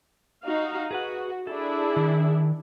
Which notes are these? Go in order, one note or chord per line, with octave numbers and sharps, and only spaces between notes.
D#4 F#4 F5
F#4 G#4 B4 F#5
D4 E4 G#4 A4
D#3